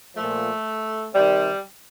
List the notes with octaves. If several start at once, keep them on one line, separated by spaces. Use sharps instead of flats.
A#2 F3 A3
C3 D#3 G3